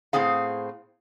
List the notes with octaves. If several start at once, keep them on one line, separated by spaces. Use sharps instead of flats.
A2 B3 C4 G#4 F5